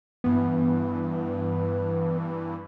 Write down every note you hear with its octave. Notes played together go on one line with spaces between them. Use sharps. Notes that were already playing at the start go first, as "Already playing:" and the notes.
G2 E3 B3